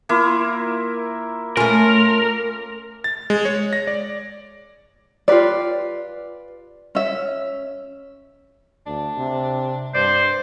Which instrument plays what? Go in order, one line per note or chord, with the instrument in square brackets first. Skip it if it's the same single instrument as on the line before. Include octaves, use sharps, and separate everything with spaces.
[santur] A#3 E4 F4
[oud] A3 C#4 [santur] F4 [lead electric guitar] A#4
[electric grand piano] A6
G#3
C#5
A#6
D5
[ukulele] F4 G4 B4 D5
C#4 E5
[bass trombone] D2 [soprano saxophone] D4
[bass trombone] C3
[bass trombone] G2 [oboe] C5 [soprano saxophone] D5